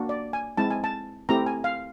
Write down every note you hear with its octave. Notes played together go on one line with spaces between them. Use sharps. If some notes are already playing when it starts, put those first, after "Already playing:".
Already playing: A#3 D4 F#4
D5
G#5
G#3 C4 E4 A5
G#5
A5
A3 C4 E4 G4 A#5
G#5
F5